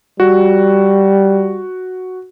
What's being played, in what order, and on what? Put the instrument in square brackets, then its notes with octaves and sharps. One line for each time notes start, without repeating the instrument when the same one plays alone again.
[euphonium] G3 [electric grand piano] F#4